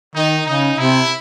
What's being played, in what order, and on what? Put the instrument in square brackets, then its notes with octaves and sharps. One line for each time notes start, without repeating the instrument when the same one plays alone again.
[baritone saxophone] D#3 [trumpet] D#4
[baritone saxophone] C#3 [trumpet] D#4
[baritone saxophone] C3 [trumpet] E4